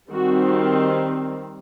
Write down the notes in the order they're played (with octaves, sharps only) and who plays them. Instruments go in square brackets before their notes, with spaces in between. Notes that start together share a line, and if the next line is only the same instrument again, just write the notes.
[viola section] D#3 G3 C4 F#4